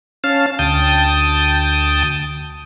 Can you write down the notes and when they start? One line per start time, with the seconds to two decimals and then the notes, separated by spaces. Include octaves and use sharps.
0.24 C#4 F5 A5
0.59 D2 G5 A5 D#6